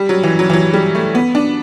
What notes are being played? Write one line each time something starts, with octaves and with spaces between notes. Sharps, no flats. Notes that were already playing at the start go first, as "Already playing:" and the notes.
Already playing: G3
F#3
E3
F#3
E3
F#3
G3
A3
B3
D4